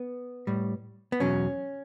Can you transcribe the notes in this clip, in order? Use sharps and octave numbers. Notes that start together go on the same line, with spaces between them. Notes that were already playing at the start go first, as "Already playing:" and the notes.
Already playing: B3
A2 G3
B3
E2 B2 F#3 C#4